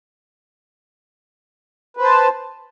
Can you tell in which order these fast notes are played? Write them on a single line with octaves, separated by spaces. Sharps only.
B4 C5 A5